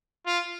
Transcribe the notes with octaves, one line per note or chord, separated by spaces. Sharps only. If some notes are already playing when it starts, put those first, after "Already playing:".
F4